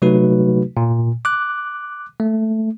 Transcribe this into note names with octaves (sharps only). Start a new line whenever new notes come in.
C3 F#3 A3 D#4 F#4 B4
A#2
D6 F#6
A3